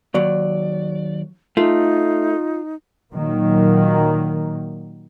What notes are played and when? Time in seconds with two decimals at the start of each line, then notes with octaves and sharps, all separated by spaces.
0.15 D#2 F#3 D5
1.57 A3 D#4 F4
3.13 A#2 D#3 F#3 A#3